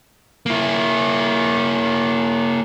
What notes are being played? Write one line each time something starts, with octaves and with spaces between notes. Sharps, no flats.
A#3 E4